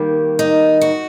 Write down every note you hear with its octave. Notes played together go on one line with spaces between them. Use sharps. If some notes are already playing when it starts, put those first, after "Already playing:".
Already playing: D#3 G3 A#3
D#4
F#4